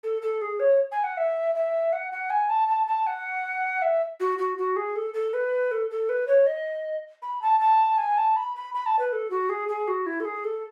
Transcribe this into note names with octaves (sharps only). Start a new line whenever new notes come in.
A4
A4
G#4
C#5
G#5
F#5
E5
E5
F#5
F#5
G#5
A5
A5
A5
F#5
E5
F#4
F#4
F#4
G#4
A4
A4
B4
A4
A4
B4
C#5
D#5
B5
A5
A5
G#5
A5
B5
B5
B5
A5
B4
A4
F#4
G#4
G#4
F#4
E4
A4
G#4
A4